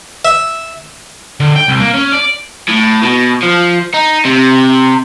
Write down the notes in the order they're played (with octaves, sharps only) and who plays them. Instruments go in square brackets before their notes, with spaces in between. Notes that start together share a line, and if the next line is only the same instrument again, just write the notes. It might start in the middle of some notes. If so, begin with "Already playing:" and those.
[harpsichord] E5
[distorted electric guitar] D3
G5
C2
A#3
C#4
D5
[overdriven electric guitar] A2
B2
F3
D#4
C3